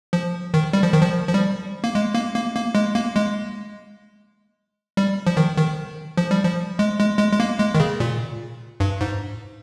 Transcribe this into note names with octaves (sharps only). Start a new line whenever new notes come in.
F3
D#3
G3
F3
D#3
F3
F3
G3
A#3
G#3
A#3
A#3
A#3
G#3
A#3
G#3
G3
F3
D#3
D#3
F3
G3
F3
G#3
G#3
G#3
G#3
A#3
G#3
D#3
C#3
A#2
G2
G#2